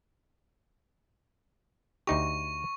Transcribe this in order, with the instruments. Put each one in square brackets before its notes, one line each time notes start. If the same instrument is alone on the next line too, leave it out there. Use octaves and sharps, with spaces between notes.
[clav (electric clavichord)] D2 D#4 G4 [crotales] C#6